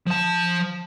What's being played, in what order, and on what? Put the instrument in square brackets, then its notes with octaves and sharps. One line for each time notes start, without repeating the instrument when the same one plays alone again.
[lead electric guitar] F3 A5